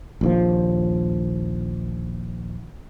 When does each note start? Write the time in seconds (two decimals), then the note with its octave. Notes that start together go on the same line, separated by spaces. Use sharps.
0.21 A#1 D#2 F3